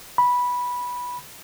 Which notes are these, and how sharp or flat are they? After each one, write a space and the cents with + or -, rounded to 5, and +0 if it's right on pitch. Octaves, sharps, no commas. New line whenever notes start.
B5 -10